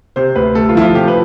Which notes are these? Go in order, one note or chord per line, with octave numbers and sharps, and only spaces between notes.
C3 C5
D2 B4
A3 A4
F4
F3 E4
F4
C3 G4
B4